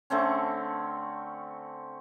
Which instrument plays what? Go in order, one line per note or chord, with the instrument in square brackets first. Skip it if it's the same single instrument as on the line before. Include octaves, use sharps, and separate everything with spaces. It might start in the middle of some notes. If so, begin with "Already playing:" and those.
[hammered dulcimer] D3 A3 C4 C#4